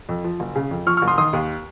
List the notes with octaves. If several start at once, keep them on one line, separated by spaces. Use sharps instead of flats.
F2
F3
F#1
C#3
F2
F3 C#6 F6
C#6 F6
F#1
C6 D#6
D#3 C6 D#6
D#2